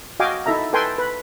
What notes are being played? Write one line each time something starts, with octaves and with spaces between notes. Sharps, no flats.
F#4 D#5 F5 G5 G#5 D6
D#4 E4 A4 E5 A#5
A4 B4 G5 G#5 C6
B4